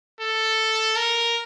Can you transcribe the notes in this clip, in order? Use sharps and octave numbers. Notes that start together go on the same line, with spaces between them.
A4
A#4